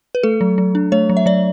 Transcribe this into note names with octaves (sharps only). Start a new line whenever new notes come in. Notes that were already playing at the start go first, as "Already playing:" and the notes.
B4
A3 A4
F#3
F#3
D4
A3 C#5
F#3
E5
F#3 D5